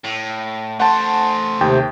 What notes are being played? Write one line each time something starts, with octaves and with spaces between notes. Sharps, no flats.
A2
A3 C5 F#5 A5
D#2 C3 G5